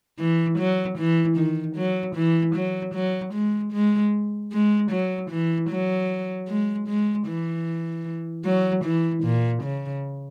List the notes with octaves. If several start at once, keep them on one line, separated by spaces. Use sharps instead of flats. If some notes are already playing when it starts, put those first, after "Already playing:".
E3
F#3
E3
D#3
F#3
E3
F#3
F#3
G#3
G#3
G#3
F#3
E3
F#3
G#3
G#3
E3
F#3
E3
A#2
C#3